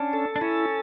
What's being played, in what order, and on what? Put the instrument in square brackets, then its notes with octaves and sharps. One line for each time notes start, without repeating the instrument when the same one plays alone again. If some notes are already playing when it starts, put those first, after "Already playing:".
Already playing: [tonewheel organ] C#4 [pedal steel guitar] D4
[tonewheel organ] A4
[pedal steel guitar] D4
[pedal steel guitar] C#4 [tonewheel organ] E4